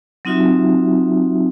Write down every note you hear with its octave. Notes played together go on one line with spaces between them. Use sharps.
F#3 C4 D#4 F4 F#4 E5